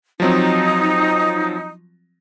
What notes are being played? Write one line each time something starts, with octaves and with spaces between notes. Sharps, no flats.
F3 F#3 C4 D#4